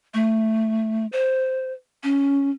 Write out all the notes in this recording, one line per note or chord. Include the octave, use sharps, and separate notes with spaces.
A3
C5
C#4